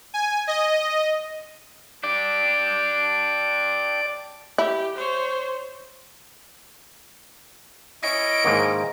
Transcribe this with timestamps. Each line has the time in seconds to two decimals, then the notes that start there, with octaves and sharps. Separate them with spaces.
0.14 G#5
0.47 D#5
2.04 D4 G4 D5
4.58 E4 G4
4.95 C5 C#5
8.03 C#4 E4 C#5 D#5 D7
8.44 G#2 D#3 A#3